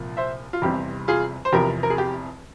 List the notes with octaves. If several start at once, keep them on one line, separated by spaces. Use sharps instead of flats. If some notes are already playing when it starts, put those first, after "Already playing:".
Already playing: C2 A#2 F3
C5 E5
F4
F1 E2 C3 G3 C4 G4
F4 G#4
C5
F1 E2 C3 F3 G4 A#4
A#4
G#4
G4